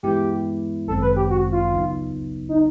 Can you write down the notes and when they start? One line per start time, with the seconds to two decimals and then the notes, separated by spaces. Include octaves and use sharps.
0.03 G2 E3 G#3 B3 E4 G4
0.88 G1 F#2 D#3 G#3 C4 A4
1.02 B4
1.16 G4
1.30 F#4
1.52 F4
1.73 C#2 C#3 F#3 B3 D#4
2.49 D#4